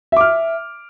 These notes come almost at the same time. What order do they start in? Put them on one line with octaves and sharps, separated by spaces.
E5 D6 F6